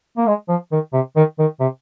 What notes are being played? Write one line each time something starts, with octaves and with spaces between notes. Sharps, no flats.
A#3
G#3
F3
D#3
C3
D#3
D#3
C3